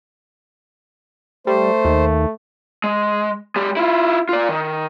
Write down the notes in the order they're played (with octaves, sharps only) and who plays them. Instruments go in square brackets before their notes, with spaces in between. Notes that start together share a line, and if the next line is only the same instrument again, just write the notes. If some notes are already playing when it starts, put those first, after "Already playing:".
[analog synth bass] G3 [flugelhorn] A3 [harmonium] C5
[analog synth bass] D#2
[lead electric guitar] G#3
G#3 G4
E4 F4
F4 D5
D#3